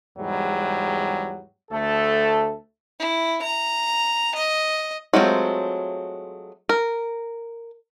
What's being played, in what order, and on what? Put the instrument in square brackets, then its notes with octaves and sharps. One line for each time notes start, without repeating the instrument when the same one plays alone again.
[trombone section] E2 G#2 F#3 G3
D2 A3 A4
[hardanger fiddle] E4
A#5
D#5
[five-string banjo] F#3 G#3 A3 C4 F4
A#4